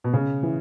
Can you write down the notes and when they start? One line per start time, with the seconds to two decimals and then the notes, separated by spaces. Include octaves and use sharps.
0.04 B2
0.13 C#3
0.43 E3